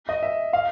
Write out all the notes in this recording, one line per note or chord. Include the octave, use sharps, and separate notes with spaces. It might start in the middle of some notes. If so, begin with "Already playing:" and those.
D#5
E5
F5